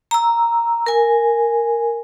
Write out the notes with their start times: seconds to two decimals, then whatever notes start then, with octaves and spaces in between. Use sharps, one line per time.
0.11 A#5 E6
0.86 A#4 G#5